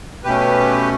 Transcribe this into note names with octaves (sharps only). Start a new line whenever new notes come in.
B2 A3 C#4 G4 B4